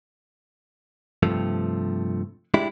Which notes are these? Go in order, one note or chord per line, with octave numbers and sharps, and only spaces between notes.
G2 C3 F3 A3
G#3 D4 E4 G4